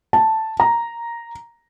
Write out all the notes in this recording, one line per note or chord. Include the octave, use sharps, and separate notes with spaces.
A5
A#5